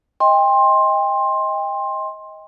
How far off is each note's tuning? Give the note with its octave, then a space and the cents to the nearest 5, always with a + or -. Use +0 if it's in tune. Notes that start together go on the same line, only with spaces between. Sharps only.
D#5 +20 G5 +30 C6 +15